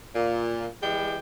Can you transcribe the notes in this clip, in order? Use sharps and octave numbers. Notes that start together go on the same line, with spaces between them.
A#2
E3 G3 G#3 G5